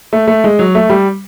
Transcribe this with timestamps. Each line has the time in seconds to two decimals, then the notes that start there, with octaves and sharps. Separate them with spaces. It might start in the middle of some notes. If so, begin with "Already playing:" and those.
0.13 A3
0.28 A3
0.44 G#3
0.59 F#3
0.75 A3
0.90 G3